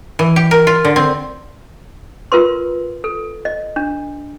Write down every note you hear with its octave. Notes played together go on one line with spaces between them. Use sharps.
E3
G4
A#4
F4
D3
C4
F4 A#4 B4 C6
A4
D#5
D4